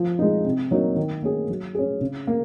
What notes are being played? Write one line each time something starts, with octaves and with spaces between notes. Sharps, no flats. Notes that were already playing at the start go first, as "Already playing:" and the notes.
Already playing: F3
G#3 D#4
C3
F#3 A#3 D#4
D#3
A#3 C#4 G#4
F#3
C#4 G#4
C#3
A#3